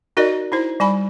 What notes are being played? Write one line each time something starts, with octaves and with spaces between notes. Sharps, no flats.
D#4 F#4 A#4 D5 D#5
D#4 E4 C5
G3 G#5 B5